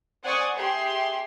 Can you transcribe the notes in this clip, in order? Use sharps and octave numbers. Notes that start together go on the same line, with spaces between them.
C5 D5 F#5 G#5 C#6 D#6
G4 G#4 E5 C6